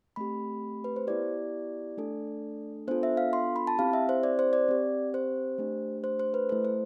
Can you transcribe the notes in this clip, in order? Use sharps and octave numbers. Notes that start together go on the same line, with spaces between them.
A3 C4 G4 B5
B4
C5
B3 E4 G4 D5
A3 D4 A4
B3 D4 F4 A4 C5
E5
F5
C6
B5
A5
C4 E4 G4 F5
E5
C5
D5
C5
D5
C4 G4
C5
A3 D4 G4
C5
C5
B4
A3 E4 A4 C5
C5